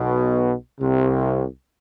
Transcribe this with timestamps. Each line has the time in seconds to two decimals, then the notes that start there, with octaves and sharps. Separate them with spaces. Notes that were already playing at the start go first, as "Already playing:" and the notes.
Already playing: B1 B2
0.79 C2 C3